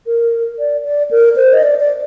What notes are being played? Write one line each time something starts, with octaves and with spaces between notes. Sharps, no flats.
A#4
D5
D5
A#4
C5
D#5
D5
D5